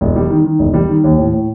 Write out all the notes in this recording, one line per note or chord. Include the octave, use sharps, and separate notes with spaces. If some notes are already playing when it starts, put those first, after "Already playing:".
E1
G3
D#3
D#3
E1
G3
D#3
D#2
A2
A2